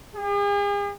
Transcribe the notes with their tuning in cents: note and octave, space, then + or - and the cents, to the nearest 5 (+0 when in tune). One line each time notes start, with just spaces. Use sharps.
G#4 -45